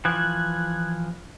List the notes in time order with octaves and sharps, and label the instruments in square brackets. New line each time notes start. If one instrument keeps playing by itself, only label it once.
[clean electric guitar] E3 F3 [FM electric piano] F#6 G#6